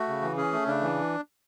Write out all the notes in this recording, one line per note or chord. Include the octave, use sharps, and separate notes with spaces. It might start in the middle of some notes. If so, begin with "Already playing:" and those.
Already playing: A3 F#4
C#3
E3
C#4 G#4
A3
C#3 D4
E3